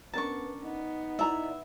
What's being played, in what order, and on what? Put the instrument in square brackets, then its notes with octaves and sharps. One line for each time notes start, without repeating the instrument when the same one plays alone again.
[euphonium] B3 [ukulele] C#4 D4 A#4 [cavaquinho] A5 C#6
[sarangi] B3 [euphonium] D#4
[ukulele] E4 D5 A#5 [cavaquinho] E5